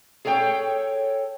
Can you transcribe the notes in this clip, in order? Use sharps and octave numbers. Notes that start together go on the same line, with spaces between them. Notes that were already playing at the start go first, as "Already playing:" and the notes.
G#4 A4 C#5 F#5 G5